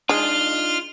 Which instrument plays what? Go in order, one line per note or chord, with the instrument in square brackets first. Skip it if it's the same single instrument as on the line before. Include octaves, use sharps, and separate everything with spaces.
[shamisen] G#3 [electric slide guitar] D4 D#4 [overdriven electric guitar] F4 [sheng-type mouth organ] C6 F6